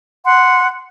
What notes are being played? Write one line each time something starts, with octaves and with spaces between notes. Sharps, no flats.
F#5 C6